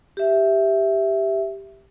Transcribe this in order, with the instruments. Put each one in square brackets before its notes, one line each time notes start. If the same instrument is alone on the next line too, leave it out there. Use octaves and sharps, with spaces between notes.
[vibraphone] G4 E5